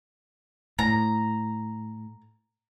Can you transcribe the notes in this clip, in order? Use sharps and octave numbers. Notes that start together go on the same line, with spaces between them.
A2 A#5